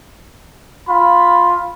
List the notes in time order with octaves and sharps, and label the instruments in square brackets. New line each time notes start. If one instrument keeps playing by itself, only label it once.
[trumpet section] F4 B5